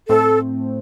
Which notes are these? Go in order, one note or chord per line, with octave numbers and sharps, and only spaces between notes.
A2 A3 C4 A4